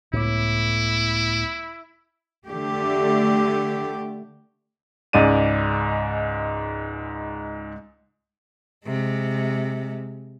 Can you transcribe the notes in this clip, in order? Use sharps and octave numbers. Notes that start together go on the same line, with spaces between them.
C#2 A2 B3 E4 D6
D3 A3 G4
C#2 G#2 D5 D#7
C3 G#3